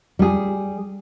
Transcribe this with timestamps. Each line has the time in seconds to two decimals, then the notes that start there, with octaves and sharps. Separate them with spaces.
0.19 G3 G#4